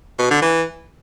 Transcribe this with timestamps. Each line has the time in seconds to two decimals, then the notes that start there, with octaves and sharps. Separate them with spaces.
0.19 B2
0.30 D3
0.42 E3